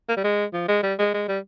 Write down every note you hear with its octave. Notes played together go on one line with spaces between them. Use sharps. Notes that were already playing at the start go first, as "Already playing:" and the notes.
A#3
G3
G#3
F3
G#3
G3
G#3
G#3
G3